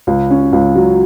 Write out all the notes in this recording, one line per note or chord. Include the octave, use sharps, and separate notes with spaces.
C#2
C#4
C#2
F#3